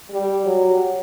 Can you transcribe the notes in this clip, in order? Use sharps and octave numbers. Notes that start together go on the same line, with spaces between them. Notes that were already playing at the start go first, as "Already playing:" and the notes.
G3
F#3